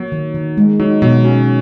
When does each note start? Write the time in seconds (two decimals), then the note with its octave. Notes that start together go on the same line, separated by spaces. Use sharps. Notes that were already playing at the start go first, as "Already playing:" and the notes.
Already playing: F#3 A#3
0.12 D#3
0.35 D#3
0.57 G#3
0.79 F#3 D#4
1.02 B2 F#3
1.24 C#4 F#4